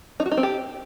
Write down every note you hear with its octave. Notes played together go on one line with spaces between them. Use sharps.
D#4
F#4
D#4
C4
G4